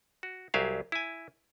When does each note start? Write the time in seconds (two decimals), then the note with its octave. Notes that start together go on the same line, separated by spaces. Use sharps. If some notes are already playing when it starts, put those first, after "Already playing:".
0.23 F#4
0.54 C2 F#3 G4 G#4 E5 F5
0.92 E4 G#5